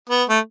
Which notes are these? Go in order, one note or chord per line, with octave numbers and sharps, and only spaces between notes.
B3
A3